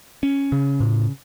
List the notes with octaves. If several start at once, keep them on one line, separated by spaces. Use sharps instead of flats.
C#4
C#3
A2